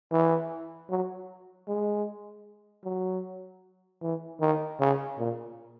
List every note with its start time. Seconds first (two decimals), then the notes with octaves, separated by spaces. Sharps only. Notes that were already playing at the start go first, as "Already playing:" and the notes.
0.11 E3
0.90 F#3
1.67 G#3
2.84 F#3
4.02 E3
4.40 D#3
4.80 C#3
5.18 A#2